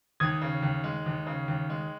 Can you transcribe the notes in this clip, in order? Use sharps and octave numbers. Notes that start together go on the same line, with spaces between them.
D#2 D#6 G#6
C#3
D#2
G#3
D#2
C#3
D#2
G#3